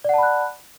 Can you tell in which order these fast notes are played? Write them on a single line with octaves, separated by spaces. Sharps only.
D5 F#5 A5 B5 F#6